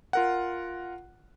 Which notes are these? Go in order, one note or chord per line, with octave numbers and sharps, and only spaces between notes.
F4 A#4 F#5